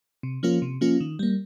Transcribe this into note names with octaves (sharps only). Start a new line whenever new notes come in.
C3
F3 A#3 C#4 F4
C3
F3 A#3 C#4 F4
D#3
G3 A#3